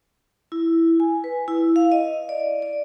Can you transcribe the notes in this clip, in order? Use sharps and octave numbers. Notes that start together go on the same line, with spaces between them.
E4
G#5
B4
E4
F5
D#5
D5
D5